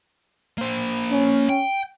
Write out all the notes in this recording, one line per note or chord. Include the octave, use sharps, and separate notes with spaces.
A#3 C5
C#4
G5